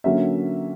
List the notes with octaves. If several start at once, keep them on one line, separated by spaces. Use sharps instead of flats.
D3 F#3 A#3 C#4 E5